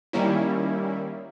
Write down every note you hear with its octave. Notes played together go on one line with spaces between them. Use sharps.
D#3 G3 A#3 C#4 E4